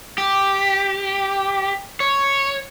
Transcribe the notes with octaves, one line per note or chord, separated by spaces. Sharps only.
G4
C#5